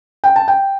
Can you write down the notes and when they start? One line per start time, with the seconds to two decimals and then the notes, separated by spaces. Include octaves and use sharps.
0.24 G5
0.36 A5
0.48 G5